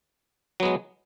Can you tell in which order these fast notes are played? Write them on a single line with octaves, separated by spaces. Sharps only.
F#3 B3 G#3